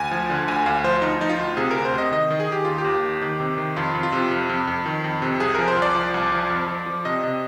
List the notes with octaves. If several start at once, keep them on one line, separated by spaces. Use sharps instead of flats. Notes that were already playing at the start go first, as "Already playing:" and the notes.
Already playing: D2 G#5
F3
D3
D2 G#5
D2 F5
F3 C5
D2 D#4
F3 D#4
F4
D2
C3 G#4
A#4
D2
C5
C3 D#5
D#3 D#5
D#3
G#4
D#3 G4
D#2 F4
G4
D#2
D#3
D#3
C3
D#3
F2 F4
F2
F4
C3
F2
F2
F2
D#3
F2
C3
C2 G#4
F3 A#4
C5
C2
D5
F3
C2
F3
F2
F3
F3
C3 D#5
C3